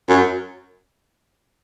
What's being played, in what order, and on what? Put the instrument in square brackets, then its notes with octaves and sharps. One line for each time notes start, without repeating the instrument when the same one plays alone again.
[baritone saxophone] F#2